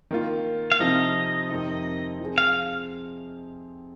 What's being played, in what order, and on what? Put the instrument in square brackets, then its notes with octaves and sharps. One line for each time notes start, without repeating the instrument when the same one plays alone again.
[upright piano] D#3 A#3 F4
[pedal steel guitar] F5
[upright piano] C3 F3 C4 D#4 [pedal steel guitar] D#5
[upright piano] F2 C3 D#3 C4 D#4
F3 C4 G#4
[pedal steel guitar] F5